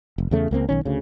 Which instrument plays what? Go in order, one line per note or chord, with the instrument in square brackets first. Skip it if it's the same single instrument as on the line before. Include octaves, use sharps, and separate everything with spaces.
[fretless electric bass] F1
E2 C#3 A3
C#2 A#3 C4
B1 D#3 C#4
D2 C#3